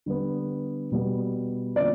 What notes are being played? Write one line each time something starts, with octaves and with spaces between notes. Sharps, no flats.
D3 G3 B3
B2 G3 B3
D3 F3 A#3 C#4 D5